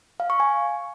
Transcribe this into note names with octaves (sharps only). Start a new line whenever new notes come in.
F5
C#6
G#5